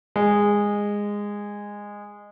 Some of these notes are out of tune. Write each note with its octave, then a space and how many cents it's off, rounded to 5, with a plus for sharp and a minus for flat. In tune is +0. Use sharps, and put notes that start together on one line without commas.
G#3 -15